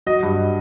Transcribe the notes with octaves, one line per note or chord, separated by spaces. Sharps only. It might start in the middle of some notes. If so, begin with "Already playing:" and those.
F#3 D#5
G2